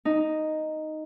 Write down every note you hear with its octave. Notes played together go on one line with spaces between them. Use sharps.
D#4